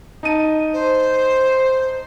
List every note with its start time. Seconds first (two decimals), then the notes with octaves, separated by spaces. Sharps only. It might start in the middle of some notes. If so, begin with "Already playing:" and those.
0.23 D#4 A5 D#7
0.73 C5